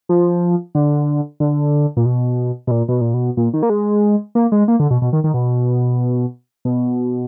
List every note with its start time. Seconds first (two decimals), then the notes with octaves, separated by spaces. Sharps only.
0.09 F3
0.75 D3
1.40 D3
1.97 A#2
2.06 B2
2.67 B2
2.71 A#2
2.88 B2
3.01 A#2
3.14 B2
3.37 A#2
3.54 D#3
3.63 A#3
3.70 G#3
4.35 A#3
4.52 G#3
4.68 A#3
4.80 D3
4.91 B2
5.02 B2
5.13 D#3
5.24 D#3
5.34 B2
6.65 B2